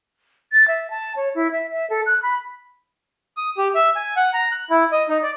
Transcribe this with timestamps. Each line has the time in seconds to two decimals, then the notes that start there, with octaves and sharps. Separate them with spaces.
0.52 A6
0.68 E5
0.90 A5
1.16 C#5
1.35 E4
1.52 E5
1.71 E5
1.90 A4
2.06 F#6
2.23 B5
3.37 D#6
3.58 G4
3.75 E5
3.96 G#5
4.17 F#5
4.34 A#5
4.52 F#6
4.70 E4
4.92 D#5
5.09 D#4
5.23 D5